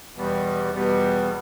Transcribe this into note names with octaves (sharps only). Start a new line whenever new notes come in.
E2 B2 G3 B3
E2 B2 G3 B3